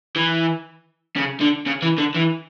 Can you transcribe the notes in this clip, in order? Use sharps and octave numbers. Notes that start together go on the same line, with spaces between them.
E3
C#3
D3
C#3
E3
D3
E3